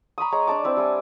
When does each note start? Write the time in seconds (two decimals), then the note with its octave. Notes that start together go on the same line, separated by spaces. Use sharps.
0.18 A#5 B5 C#6 D#6
0.32 G#3 C#5 A#5
0.47 D4 D5 A5 D6
0.64 C4 E4 B4
0.77 G3 E4 G#5